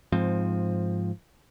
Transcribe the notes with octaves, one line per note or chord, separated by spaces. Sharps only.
G#2 F3 C4